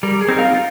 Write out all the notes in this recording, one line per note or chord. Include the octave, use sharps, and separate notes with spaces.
G3 A#4
G#4
C4 D#4 A#4
F4